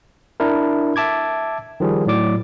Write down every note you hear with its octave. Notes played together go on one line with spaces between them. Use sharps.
D4 E4 A#4
E5 A5 D6 G#6
D#3 F3 G3 G#4
A2 F#3 D5 D6